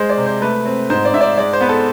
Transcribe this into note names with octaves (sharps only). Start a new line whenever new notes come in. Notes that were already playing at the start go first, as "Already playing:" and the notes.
Already playing: G#3 C5
D5
C3
C5
A3 B4
C4
G#2 C5
D5
G#2 E5
D5
G#3 D5
C5
B3 B4
A4